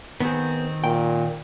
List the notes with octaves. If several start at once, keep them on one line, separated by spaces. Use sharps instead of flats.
D#3 B3 C4 G#4
A#2 G5